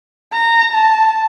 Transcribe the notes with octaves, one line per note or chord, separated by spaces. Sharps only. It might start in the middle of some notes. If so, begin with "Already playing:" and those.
A#5
A5